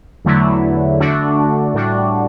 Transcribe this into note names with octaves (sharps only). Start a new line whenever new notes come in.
E2 D3 F#3 A3 E4
D3 A3 D4 F#4
A2 G3 D4 F#4